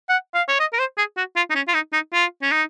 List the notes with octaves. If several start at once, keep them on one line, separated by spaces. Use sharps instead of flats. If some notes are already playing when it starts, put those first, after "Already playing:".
F#5
F5
C#5
D#5
A#4
C5
G#4
F#4
F4
D#4
C#4
F4
D#4
D#4
F4
C#4
D#4